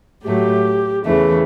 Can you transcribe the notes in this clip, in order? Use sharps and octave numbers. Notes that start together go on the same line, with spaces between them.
A2 F#3 A3 G4
E2 C#3 E3 A3